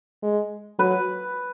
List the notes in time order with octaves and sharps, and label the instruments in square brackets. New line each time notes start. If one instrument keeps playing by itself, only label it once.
[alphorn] G#3
[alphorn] F#3 [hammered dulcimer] B4